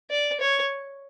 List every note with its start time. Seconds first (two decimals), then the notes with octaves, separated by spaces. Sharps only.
0.11 D5
0.40 C#5